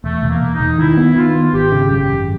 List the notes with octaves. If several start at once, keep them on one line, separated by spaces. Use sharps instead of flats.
E1 A3
E1
A#3
E1
D#4
E1
D#3 E4
B3
D#3 F4
B3
G#1 G4
C#3
F#2 G4
G#1